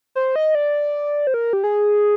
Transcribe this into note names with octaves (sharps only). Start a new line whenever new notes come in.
C5
D#5
D5
C5
A#4
G4
G#4